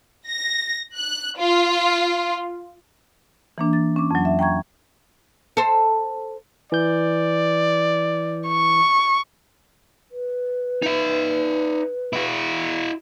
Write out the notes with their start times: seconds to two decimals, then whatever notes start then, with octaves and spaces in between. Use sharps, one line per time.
0.28 A#6
0.95 F#6
1.37 F4
3.58 E3 A#3 D4
3.73 A6
3.96 C#4 D6
4.11 F2 F#3
4.25 E5
4.39 G5 A#5 C#6 G#6
5.57 A4 C5
6.72 E3 D5 G6
8.48 C#6
10.10 B4
10.82 D#4 E5
12.13 E4 F#4